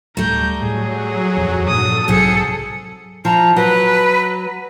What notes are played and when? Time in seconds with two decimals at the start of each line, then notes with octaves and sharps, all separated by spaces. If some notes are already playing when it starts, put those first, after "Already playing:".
0.17 D1 G3 A3 A#5 G6
0.61 A2 F#3 G#4
1.37 D#1 F2 F3
1.67 G2 A#2 F3 A4 D#6
2.08 B1 G#2 C3 F#3 G#4 C5 F#5 C#7
3.25 F3 A#5
3.56 F#3 B4